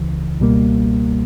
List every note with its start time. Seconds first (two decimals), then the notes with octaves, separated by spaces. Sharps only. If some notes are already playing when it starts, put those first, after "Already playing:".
Already playing: C#2 C#3 E3
0.40 C#2 B2 G3 A#3